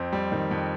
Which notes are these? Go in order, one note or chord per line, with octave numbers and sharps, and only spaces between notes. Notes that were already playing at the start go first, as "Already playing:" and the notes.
Already playing: F2 C4
G3
D#3
F2